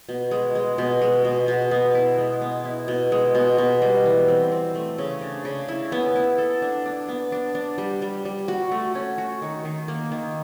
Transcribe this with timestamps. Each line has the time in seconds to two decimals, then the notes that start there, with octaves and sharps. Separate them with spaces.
0.09 B2
0.31 G#3
0.55 G#3
0.78 B2
1.02 G#3
1.24 B2
1.48 B2
1.71 B3
1.95 E4
2.18 G#3
2.42 B3
2.65 E4
2.88 B2
3.12 G#3
3.35 B2
3.58 B2
3.82 G3
4.05 E3
4.28 C4
4.52 C4
4.75 A3
4.98 C#3
5.22 D4
5.45 C#3
5.68 E4
5.92 B3
6.16 E4
6.38 A4
6.62 D4
6.86 D4
7.08 B3
7.32 D4
7.55 D4
7.78 G3
8.02 G3
8.25 G3
8.48 F#4
8.72 A3
8.95 C#4
9.18 F#4
9.42 D#3
9.65 D#3
9.88 A#3
10.11 D#3